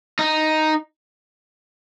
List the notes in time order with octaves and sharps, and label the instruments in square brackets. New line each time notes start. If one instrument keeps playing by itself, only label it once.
[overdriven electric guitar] D#4